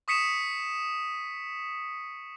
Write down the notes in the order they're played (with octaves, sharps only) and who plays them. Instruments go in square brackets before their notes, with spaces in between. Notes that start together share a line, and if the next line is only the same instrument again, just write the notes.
[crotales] C#6 D#6 B6 C#7 D#7 E7